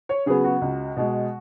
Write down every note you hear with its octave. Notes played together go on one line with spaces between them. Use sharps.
C#5
C#3 F#3 B3 G#4
F#4
C#2
B2 G#3